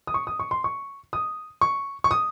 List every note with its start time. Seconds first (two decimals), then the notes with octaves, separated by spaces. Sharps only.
0.07 D#6
0.14 C#6
0.27 D#6
0.40 C#6
0.51 C6
0.64 C#6
1.13 D#6
1.61 C#6
2.04 C#6
2.11 D#6